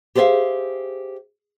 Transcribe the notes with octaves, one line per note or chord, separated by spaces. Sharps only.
G4 G#4 C5 D5 E5 F5